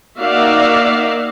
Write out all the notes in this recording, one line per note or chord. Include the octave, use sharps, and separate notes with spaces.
A#3 D#4 F#4 D5 E5 F5